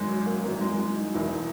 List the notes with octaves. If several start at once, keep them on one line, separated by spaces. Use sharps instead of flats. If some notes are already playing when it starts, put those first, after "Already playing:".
Already playing: G#1 F#2 D#3 G#3
F#3
A#3
G#1 F#2 E3 A#3
G#3
G#3
D#4
E1 E2 D#3 E4